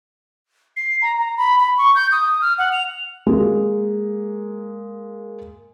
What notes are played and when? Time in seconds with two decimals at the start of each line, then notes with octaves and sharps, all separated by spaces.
0.76 C7
1.02 A#5
1.18 A#5
1.37 B5
1.59 B5
1.78 C#6
1.95 G6
2.12 D#6
2.41 F6
2.58 F#5
2.72 F7
3.27 G#3 A#3